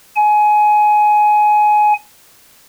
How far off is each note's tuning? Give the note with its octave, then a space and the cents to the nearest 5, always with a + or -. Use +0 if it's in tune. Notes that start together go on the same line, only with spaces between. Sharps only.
G#5 +20